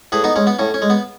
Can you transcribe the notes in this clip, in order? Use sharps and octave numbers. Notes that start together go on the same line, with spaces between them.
A2 G#4 B4
B3 D#4
G#3 C#4
B3
A2 C#4
C#4
G#3
B3